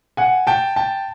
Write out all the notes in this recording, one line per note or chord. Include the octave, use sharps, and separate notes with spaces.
F#5 G#5
G5 A5
G5 A5